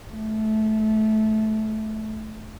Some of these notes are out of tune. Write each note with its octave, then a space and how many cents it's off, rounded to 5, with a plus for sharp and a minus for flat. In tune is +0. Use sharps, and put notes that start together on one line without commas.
A3 -20